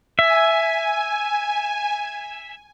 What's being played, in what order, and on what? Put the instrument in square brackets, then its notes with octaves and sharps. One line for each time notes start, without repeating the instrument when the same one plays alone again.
[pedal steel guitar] E5 [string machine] G#5